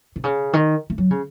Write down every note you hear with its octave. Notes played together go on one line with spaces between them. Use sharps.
C3
C#3
D#3
A3
F#3
C#3